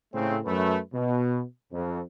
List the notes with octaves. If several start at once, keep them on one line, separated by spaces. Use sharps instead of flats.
A2 C#3 A3 C4
F#2 A3 B4
B2
F2